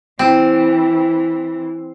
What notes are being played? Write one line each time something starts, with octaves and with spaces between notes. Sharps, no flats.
E3 C4